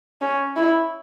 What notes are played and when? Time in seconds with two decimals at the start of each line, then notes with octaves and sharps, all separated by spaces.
0.21 C#4
0.56 E4